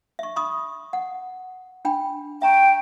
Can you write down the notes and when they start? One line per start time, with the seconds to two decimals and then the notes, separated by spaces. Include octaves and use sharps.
0.19 E5 C#6
0.36 B5 C#6 D#6
0.93 F#5
1.85 D4 G5 B5
2.42 E5 G5 A#5 C#6